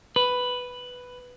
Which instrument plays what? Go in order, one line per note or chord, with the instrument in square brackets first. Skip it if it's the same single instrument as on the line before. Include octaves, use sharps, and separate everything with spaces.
[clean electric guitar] B4